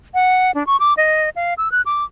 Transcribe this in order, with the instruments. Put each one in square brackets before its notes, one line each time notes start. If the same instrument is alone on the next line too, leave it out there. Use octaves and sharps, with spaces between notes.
[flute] F#5
D4
C#6
D6
D#5
F5
E6
F#6
D6